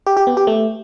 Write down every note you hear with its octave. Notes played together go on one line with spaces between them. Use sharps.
G4
G4
B3
G4
A3